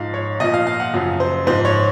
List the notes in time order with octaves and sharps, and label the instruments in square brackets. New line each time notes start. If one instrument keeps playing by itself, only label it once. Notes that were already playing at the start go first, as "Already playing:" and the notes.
Already playing: [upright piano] G#2 F3 F5
C#5
A#2 F3 D#5
F5
F5
F#5
F#2 C#3 F3
C5
G#2 F3 C5
C#5